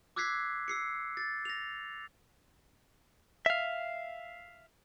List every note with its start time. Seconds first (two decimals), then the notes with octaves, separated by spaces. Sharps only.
0.16 D6 E6 F#6 G#6 B6 C7
0.68 E6 C7 C#7
1.17 A6
1.45 A#6 F7
3.46 E5 F5